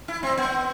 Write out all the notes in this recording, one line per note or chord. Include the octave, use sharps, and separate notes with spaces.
E4
C4
B3